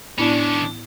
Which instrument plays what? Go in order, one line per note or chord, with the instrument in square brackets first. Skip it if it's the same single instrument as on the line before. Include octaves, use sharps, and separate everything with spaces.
[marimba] A2 B3 E4 [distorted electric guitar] D#3 C#4 [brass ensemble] D4